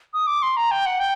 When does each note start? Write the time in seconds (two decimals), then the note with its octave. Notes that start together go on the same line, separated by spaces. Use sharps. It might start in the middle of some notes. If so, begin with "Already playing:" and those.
0.13 D#6
0.27 D6
0.42 C6
0.57 A#5
0.71 G5
0.86 F#5
1.00 G5